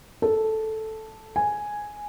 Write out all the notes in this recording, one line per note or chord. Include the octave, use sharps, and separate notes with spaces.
A4
G#5